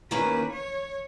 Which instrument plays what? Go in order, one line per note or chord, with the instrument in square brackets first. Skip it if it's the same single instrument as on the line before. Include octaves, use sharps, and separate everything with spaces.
[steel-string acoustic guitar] D#2 D#3 A#3 C#4 [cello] B4
[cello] C#5